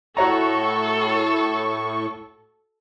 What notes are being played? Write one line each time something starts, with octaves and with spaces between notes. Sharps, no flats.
A2 F#4 A4 C#5 A#5 C#6